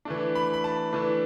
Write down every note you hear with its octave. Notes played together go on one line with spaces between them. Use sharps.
E3 A3 D4
B5
B5
A5
E3 A3 D4